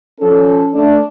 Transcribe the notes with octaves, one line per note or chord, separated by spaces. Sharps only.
F3 C#4 A4
A3 D4